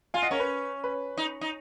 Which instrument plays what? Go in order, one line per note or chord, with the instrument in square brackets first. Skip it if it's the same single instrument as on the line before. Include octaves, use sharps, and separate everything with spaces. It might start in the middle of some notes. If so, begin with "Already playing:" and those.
[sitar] F4 [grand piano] F5 G#5
[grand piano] D#5 F#5
[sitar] C#4 [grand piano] A#4 C#5
[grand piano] B4
B4
[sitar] D#4
D#4